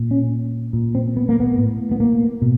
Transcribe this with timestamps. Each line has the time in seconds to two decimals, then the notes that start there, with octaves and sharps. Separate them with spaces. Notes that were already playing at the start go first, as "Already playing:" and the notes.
Already playing: A#2
0.11 C#4
0.73 A#2
0.95 C4
1.17 B3
1.29 A#3
1.40 B3
1.58 A2
1.91 B3
2.00 A#3
2.42 B2